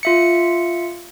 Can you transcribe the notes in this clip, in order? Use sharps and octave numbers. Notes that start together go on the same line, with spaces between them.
F4 E5 C#7